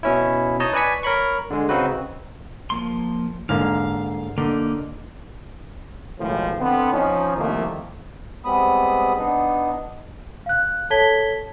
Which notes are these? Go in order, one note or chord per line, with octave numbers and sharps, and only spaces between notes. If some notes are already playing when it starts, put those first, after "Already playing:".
B2 C#4 E4
D#4 C#5 D#5 A5
B4 D5 G#5 C#6 B6
A#4 C#5 B5 C#6
D3 G#3
C#3 C4 D#4 F#4 B4
F3 A#3 C6
G#2 D3 A#3 F5
D3 A#3 D#4
B1 A2 D#3 F3 G#3
D3 B3 C4
F3 C#4 D#4
C2 D#3 F3 A3 A#3
G3 G#3 B3 C4 B5 D#6
B3 D4 D#4
F5 F#6
A4 C#5 A5 G#6 B6 G7